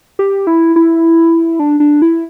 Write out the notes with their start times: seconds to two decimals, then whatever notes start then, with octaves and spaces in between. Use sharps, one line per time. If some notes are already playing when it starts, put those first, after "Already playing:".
0.19 G4
0.47 E4
0.76 E4
1.59 D4
1.80 D4
2.02 E4